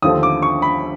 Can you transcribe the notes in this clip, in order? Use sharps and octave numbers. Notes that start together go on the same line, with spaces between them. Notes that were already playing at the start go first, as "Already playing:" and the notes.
D#2 D3 F3 A3 C4 D#6
D6
C#6
B5